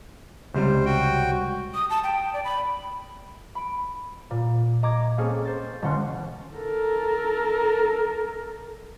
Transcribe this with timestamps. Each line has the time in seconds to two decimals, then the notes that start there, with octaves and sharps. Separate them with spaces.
0.54 C#2 C3 G3 C5
0.85 F#4 G5
1.74 D#6
1.90 A5
2.04 G5
2.33 D5
2.45 B5
3.55 B5 D7
4.31 A#2
4.83 D#5 A#5 D6 G#6
5.17 A#3 C4 C#4 G#4 A4
5.45 C5 A6
5.82 E1 D3 C#4 F#5 C6
6.56 A4 A#4